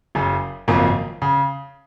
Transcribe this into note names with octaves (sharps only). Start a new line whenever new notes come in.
F#1 F#2 C#3
G#1 F#2 C#3 F3 A#3
C#3